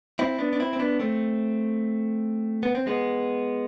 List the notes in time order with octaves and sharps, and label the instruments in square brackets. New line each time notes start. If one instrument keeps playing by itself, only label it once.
[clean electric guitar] C4 E4
B3 D4
D4
C4 E4
C4
B3 D4
A3 C4
B3
C4
G#3 B3